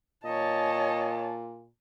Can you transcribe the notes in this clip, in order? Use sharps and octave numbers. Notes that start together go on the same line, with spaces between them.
A#2 C#5 D#5 A5